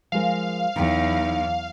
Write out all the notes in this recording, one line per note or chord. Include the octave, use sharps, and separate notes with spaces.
F3 G#3 A#4 F5
E2 F#3 D#4 G5